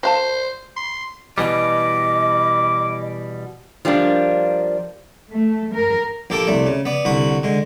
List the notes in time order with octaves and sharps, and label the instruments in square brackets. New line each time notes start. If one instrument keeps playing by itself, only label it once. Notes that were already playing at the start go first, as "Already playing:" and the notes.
[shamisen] F#4 F5 A5 [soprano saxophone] C5
[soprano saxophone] C6
[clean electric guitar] B2 E3 G3 [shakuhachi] D#5 [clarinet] D6
[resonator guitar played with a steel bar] F3 G3 A#3 D4
[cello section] A3
A#4
[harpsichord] A#1 A#3 G4 A4 A5 D6
C2 A3 D5
C#3
B3 D5
C2 D3 F#4 B5
D3 G#3